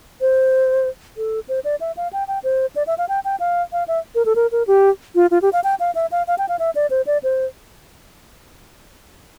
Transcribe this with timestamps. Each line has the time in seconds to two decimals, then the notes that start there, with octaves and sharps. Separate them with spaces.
0.21 C5
1.17 A4
1.49 C5
1.65 D5
1.81 E5
1.97 F5
2.13 G5
2.28 G5
2.44 C5
2.76 D5
2.87 E5
2.98 F5
3.09 G5
3.25 G5
3.40 F5
3.73 F5
3.88 E5
4.15 A#4
4.26 A4
4.36 A#4
4.52 A#4
4.67 G4
5.15 F4
5.31 F4
5.42 G4
5.53 F5
5.64 G5
5.80 F5
5.95 E5
6.12 F5
6.27 F5
6.38 G5
6.49 F5
6.59 E5
6.75 D5
6.90 C5
7.07 D5
7.23 C5